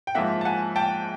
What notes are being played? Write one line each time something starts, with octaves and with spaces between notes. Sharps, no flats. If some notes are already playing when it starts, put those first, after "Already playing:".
G5
G#2 F3 A#3 E5 F#5
A5
F#5 G#5
G5 A5